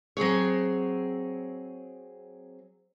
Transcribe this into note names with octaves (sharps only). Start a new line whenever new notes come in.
F#3 C4 G#4 C#5